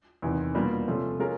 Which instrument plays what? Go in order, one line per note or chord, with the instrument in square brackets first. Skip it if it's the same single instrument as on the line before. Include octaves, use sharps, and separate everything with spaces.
[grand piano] E2 C3 D#3
B2 G3 A#3 D4 F4
C3 F3 A3 C#4
G#3 C#4 F4 A#4